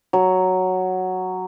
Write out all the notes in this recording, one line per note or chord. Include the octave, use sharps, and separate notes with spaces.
F#3